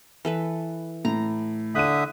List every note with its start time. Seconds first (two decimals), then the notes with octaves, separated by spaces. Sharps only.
0.25 E3 A4 B4
1.05 A2 A#5
1.75 D3 E5 D#6 F#6 D#7